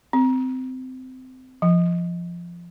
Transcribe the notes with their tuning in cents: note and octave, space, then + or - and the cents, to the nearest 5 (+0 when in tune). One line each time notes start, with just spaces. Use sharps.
C4 -20
F3 -15